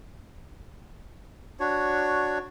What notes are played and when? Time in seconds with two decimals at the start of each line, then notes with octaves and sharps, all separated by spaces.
1.60 D4 F#4 C#5